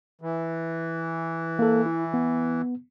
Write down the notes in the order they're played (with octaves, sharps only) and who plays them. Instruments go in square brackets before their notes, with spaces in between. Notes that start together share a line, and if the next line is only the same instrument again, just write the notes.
[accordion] E3
[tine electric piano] A#3 A4
E4
B3